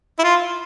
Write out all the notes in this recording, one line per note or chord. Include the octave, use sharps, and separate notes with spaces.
E4
F4